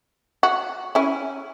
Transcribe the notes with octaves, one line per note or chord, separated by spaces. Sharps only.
F#4
C#4 E4